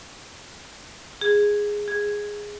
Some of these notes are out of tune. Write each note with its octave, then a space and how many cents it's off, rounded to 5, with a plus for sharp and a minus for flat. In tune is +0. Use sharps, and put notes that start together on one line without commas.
G#4 -5
G#4 -5